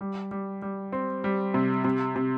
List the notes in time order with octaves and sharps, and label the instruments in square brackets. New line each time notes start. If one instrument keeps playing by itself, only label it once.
[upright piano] G3
G3
G3
C4
G3
C3
C3
C3